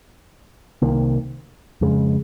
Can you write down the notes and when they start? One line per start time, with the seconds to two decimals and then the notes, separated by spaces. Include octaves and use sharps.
0.82 C2 C3 D#3 A#3
1.81 F2 C#3 G#3